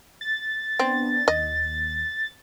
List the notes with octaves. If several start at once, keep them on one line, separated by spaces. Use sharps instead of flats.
A6
B3 C4 D4
D#2 D#5